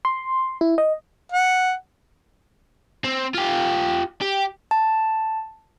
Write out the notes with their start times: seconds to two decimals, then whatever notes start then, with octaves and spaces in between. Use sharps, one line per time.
0.05 C6
0.61 E4
0.78 D#5
1.32 F#5
3.04 C4
3.34 F4 G4
4.22 G4
4.71 A5